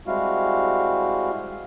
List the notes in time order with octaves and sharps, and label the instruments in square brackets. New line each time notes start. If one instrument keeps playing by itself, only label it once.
[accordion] G3 G#3 C4 E4 F#4 F5